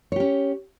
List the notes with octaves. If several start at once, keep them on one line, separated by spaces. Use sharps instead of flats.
C#4 G4 C#5